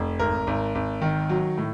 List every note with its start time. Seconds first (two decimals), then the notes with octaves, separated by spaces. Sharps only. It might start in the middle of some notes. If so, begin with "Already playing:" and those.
Already playing: F1
0.19 G#1 A#4
0.47 G#1
0.75 G#1
1.01 D#3
1.29 F#3
1.57 A2